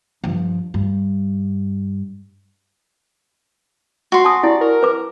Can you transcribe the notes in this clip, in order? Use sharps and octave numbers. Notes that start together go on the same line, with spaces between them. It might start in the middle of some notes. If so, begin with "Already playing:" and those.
G2 F3
G2
F#4 C6
G#5 A5 D#6
E4 G4 D5
A#4
B4 D6